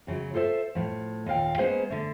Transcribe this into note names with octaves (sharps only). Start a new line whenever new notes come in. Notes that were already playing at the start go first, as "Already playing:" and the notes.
F#2 C#3 F#3
F4 A4 C5 D5 E5
A2 F3
D#2 A#2 F5 G5
G#3 A#3 B3 C#4 G#4 C5
D3 A3